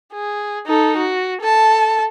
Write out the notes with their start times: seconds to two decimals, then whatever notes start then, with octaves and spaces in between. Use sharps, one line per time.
0.13 G#4
0.67 D#4 A4
0.97 F#4
1.41 A4 A5